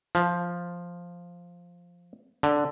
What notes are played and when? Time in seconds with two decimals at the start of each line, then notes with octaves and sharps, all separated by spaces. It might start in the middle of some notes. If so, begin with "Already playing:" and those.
0.15 F3
2.43 D3